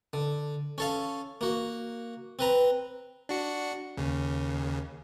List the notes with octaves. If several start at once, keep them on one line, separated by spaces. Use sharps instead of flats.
D3
C#4 A4 F5
A#3 F#4
C4 B4 A#5
D4 F#4 C#7
D#2 C#3